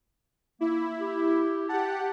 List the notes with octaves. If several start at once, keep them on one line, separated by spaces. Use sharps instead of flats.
A#3 E4
G4
G4 F#5 A5